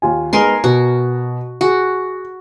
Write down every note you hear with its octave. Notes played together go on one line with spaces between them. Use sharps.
D#2 F4 G#5
G#3 B3 D#4 A#4 G#5 C6
B2 F#4
F#4 G#4